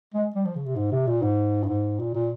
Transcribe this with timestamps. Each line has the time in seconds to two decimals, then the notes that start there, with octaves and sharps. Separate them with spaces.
0.14 G#3
0.35 G3
0.45 F3
0.55 C#3
0.66 C3
0.75 G#2
0.91 C3
1.07 A#2
1.22 G#2
1.63 G2
1.68 G#2
1.99 A#2
2.14 A#2